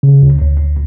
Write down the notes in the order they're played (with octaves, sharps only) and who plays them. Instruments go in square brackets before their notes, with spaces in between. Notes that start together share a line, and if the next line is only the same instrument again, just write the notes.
[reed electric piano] C#3
D2
D2
D2